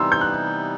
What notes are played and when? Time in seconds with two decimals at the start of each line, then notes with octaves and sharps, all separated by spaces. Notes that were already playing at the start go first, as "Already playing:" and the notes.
Already playing: C3 E3 G3 B3 D#4 C6 E6
0.12 G6
0.21 F#6